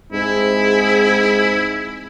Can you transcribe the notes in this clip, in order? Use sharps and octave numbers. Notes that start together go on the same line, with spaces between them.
G#2 C4 E4 G#4